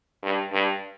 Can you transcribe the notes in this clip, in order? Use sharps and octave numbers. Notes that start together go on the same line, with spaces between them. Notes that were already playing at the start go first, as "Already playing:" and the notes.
G2
G2